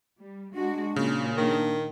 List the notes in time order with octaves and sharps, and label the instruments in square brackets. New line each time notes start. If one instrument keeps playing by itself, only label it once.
[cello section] G3
[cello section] G#3 F#4 [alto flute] D4
[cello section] A#2 [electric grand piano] C#3
[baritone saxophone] D#3 [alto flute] D4